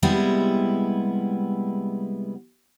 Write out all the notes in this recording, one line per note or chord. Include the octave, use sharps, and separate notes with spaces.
C3 G3 G#3 B3 E4